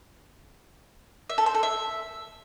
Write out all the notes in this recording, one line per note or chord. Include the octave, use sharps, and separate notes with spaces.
E5
A4
C5
A4
E5